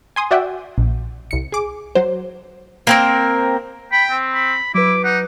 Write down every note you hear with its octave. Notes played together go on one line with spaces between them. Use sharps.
G#5 C6 D#6
F#4 D5 E5 F#5 G5
A#1
C2 C#7
G#4 D6
F#3 C5
A#3 C4 A#4
G5 B5
C4
B5
F#3 E4 B4 D6
D#4 F#5